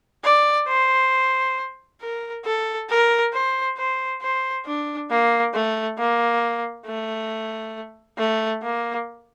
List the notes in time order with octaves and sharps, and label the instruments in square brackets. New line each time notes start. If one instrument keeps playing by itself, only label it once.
[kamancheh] D5
C5
A#4
A4
A#4
C5
C5
C5
D4
A#3
A3
A#3
A3
A3
A#3